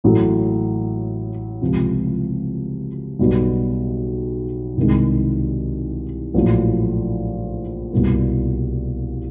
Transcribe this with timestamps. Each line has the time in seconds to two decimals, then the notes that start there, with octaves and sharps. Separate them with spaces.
0.04 A1 A2 F#3 A3
1.62 C#2 C3 F3
3.19 B1 B2 G3
4.77 C2 C3 D#3 G#3
6.34 A#1 A2 F#3
7.92 C2 B2 G3 A#3